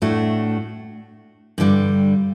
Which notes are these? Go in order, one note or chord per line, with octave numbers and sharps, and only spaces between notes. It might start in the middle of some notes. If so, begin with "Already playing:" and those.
A2 A3 D4 F#4
G2 D3 G3